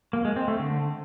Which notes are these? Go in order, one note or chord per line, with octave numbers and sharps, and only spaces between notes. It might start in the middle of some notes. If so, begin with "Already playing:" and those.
A#3
G#3
C4
A3
D3